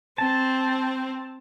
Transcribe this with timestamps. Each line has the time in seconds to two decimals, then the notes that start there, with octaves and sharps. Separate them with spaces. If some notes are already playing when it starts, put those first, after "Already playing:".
0.18 C4 A5